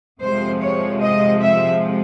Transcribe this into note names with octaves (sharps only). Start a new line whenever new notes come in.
F2 C3 F3 G#3 C5
C#5
D#5
E5